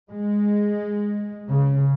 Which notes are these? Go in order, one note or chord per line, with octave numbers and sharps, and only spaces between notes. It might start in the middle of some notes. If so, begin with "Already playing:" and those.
G#3
C#3